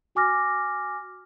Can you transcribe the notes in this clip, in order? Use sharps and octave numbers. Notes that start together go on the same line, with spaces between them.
F#4 G#5 D6 F6 A#6